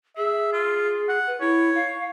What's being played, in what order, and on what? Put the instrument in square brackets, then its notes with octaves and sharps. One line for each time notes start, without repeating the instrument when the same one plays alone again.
[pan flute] G#4 [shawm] E5
[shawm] F4
F#5
[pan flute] B4
[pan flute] E4 [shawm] C#5
[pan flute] F5